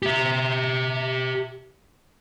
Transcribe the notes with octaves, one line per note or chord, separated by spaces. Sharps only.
G4 E5